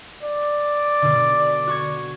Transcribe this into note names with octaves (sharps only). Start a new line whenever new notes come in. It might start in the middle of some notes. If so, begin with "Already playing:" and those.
D5
B2 D3
F#4 C#6 G#6